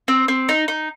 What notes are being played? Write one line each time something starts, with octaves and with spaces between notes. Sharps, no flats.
C4
C4
D#4
D#4